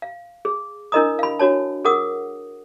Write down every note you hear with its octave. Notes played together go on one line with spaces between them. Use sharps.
F5
G#4
D4 E4 A#4 D#5 A#5 D#6
F5 B5
D4 F#4 C#5 A5
G#4 A#4 F#5 D#6